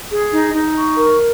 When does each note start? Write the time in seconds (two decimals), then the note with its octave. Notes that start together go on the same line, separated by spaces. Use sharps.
0.09 G#4
0.32 D#4
0.54 D#4
0.76 C#6
0.97 A#4